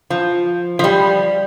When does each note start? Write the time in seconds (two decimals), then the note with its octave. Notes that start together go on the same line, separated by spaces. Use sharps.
0.10 F3
0.79 F3
0.84 G3